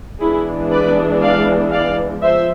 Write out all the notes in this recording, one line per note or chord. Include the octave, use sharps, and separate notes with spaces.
E3 G#3 B3 D4 E4 G#4
B4 D5
D5 F5
D5 F5
F3 C5 E5